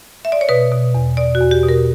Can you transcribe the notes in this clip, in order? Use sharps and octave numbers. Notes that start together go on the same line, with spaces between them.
E5
D5
C#5
B2 B4
B2
E2
B2 D5
F#4
E2
G4
B2
A#4